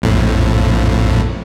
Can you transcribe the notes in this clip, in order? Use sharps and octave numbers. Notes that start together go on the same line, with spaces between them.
A#1 F2 A2